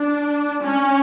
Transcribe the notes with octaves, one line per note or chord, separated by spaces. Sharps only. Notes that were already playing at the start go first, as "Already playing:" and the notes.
Already playing: D4
C#4